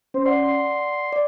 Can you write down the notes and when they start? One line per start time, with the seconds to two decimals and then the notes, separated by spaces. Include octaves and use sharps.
0.14 C#4 C5
0.26 D5 F#5 C6
0.43 C6
1.13 D5